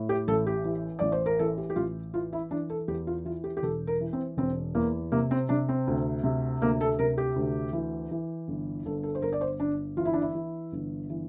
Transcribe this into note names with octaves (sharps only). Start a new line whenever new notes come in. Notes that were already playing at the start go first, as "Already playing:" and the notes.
Already playing: A2
G4
A1 A4
G4
E3
A1 D5
C5
A#4
E3 A4
G4
G4
A1 F4
E3 F4
E4
E3 D4
A4
E2 G4
F4
E3 F4
G4
G4
E1 A4
A#4
E3
C4
E1 C4
E2 A#3
C3 A#3
C4
C3 D4
C4
D2
C3
D2 A#3
A4
C3 A#4
G4
D2
E3
E3
G1
G1 A4
A4
C5
G1 A#4
D5
C5
G1 D4
E3 F4
E4
D4
E4
E3
G1
E3